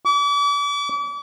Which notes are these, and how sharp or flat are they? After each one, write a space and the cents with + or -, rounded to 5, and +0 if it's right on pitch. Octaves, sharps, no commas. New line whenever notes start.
D6 -40